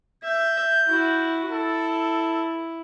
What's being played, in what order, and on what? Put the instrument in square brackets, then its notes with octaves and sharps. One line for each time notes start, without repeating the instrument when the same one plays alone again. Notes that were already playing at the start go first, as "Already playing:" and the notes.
[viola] E5 [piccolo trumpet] G6
[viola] E4 F#4
[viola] E4 [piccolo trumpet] A4